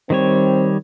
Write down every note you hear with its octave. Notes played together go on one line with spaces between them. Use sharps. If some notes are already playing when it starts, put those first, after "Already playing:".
D#3 G3 C4 C#5